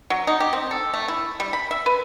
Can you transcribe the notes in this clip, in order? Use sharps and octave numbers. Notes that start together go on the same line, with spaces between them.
F#3
D#4
G4
C4
A4
A3
E4
G3
B5
E5
B4